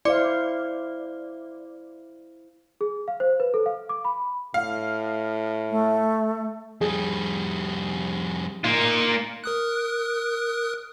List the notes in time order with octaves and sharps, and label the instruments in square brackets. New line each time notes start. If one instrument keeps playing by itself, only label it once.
[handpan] E4 C5 F5 [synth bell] D5 D6
[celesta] G#4
F5
C5
B4
A4
F5
D6
B5
[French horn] A2 [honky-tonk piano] F5
[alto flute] A3
[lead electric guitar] F2 G3 [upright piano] G#4
[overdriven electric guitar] A#3 F4 [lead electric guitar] D#4
[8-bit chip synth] A#4 D#6 F#6